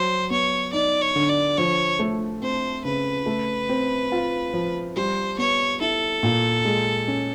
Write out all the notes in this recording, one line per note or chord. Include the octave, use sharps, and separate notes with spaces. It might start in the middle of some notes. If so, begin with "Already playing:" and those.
Already playing: F#3 C5
B3 C#5
D#4 D5
C#5
D3
D5
F3 C#5
A3
C4 C5
C#3 B4
A3
C4
F4
F3
G3 C5
B3 C#5
E4 A4
A#2
G#3
C#4